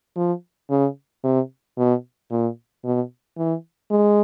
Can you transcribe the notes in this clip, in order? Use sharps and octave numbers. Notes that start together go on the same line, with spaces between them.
F3
C#3
C3
B2
A#2
B2
E3
G#3